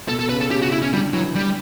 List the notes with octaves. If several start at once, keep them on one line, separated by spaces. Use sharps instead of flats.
B2 A4
A4
C#3 B4
A4
C#3 G4
F#4
E4
C#4
D3 G3
E3 F#3
G3